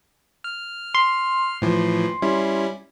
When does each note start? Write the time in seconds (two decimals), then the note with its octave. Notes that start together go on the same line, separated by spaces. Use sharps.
0.44 F6
0.95 C6
1.62 A2 E3 F3
2.22 G3 C#4 E4